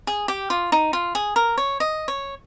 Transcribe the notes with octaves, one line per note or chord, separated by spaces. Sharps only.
G#4
G4
F4
D#4
F4
G#4
A#4
C#5
D#5
C#5